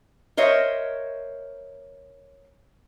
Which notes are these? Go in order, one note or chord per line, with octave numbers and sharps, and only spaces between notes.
A#4 C5 C#5 D#5 E5